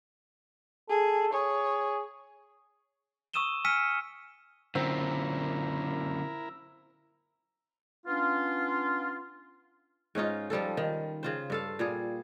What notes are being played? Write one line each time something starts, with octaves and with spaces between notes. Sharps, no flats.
G#4 A4
G#4 C#5
C#6 D#6 E6 D#7 E7 G7
G#5 E6 F6 B6 C#7 D#7
F#2 A#2 D3 C4 E4 A#4
B3 C#4 D4 F4
G#2 C#4 D#4 F4
F3 G3 F4 A4
D#3
C#3 F4 C5
G2 A4 F5
A#2 G3 G#4